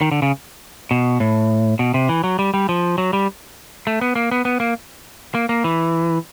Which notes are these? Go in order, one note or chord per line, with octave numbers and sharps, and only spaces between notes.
D#3
D3
C#3
B2
A2
B2
C3
E3
F#3
G3
G3
F3
F#3
G3
A3
B3
A#3
B3
B3
A#3
A#3
A#3
E3